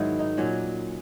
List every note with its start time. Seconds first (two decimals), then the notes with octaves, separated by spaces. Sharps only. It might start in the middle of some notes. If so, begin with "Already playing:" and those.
Already playing: G#2 D#3 F#3 E4
0.19 D#4
0.37 A#2 F#3 C#4